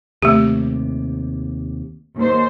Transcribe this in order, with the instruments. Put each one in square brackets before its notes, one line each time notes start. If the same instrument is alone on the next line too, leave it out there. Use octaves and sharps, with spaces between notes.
[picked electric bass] D#2 C3 [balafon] A3 G4
[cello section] D#2 C5